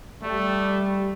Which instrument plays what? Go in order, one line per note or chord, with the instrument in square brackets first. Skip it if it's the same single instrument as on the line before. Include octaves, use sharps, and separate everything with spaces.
[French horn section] G3 [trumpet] A3